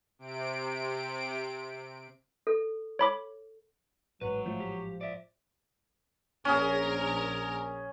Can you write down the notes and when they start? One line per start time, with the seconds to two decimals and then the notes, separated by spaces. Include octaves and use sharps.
0.19 C3 D7
2.47 A4
2.99 C#5 B5 D6
4.21 A1 G#2 F#3 B4
4.46 F3 A3
4.60 G4
5.01 D5 E5
6.45 A#1 C#4 G#4 A#4